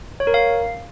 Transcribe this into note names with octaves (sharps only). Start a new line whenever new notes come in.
C#5
A#4
F5